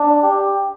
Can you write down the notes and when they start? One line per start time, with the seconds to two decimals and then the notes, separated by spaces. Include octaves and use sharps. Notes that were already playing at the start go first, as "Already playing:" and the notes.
Already playing: D4
0.23 G4